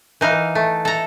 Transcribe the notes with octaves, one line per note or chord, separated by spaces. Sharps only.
E3 D#4 F5
A3
A4 A#5